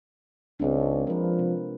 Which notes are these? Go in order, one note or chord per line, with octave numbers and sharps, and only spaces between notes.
C#2 G#3 C4 D4
F3 A#4 B4
C3